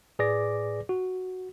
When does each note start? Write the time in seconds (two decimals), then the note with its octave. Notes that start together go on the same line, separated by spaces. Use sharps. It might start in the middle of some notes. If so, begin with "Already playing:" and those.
0.19 A2 G#4 B4 D5 D6 A#6
0.89 F#4